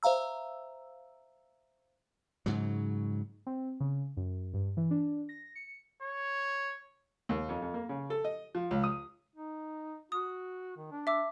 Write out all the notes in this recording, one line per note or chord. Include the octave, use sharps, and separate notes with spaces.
C5 E5 F5 A#5 E6
G#2 C#3 F#3
C4
C#3
F#2
G2
E3
D4
A#6
C#7
C#5
D#2
F2
F2
A#3
C#3
A4
D#5
F3
C#2
D#6
D#4
F#4 D#6
D#3
D4
E5 D6 E6